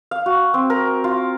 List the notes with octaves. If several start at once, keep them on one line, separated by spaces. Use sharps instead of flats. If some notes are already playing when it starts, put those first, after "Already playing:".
F5
F#4
C4
A#4
F4